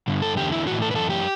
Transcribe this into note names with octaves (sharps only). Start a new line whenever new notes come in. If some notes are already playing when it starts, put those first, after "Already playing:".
G2 D3
A4
E2 D3 G4
E4
A2 E3 F#4
A4
B4
F#2 E3 A4
G4